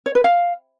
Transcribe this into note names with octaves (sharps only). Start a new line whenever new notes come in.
C#5
B4
F5